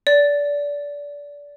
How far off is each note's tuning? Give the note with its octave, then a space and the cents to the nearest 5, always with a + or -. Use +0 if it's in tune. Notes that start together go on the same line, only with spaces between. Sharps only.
D5 -25